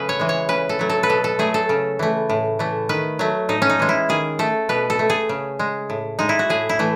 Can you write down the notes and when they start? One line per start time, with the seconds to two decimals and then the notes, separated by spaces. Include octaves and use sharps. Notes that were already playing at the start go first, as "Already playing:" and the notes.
Already playing: C#3 F#3 A3 G#4 B4
0.09 C#5
0.19 E3 G#3
0.29 C#5
0.49 C#3 B4
0.69 A4
0.79 F#3 A3
0.89 A4
1.03 B4
1.09 B2 A4
1.24 A4
1.39 F#3 A3 G#4
1.54 A4
1.69 C#3
1.99 E3 A3
2.30 A2
2.59 E3 A3
2.89 D#3 B4
3.19 F#3 A3
3.49 A2 D#4
3.62 C#4
3.69 D#4
3.79 E3 G#3
3.89 E4
4.09 D#3 G#4
4.39 A3 A4
4.69 B2 B4
4.90 A4
4.99 A3
5.10 G#4
5.29 C#3
5.59 G#3
5.90 A2
6.19 G#3 D#4
6.29 E4
6.39 F#4
6.49 A2 G#4
6.69 E4
6.79 E3 A3